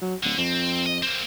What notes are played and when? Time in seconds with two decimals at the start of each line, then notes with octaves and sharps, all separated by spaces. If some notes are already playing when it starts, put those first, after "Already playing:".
0.02 F#3
0.23 D1 D3
0.38 F2 C4
0.86 D#5
1.03 A#3 C4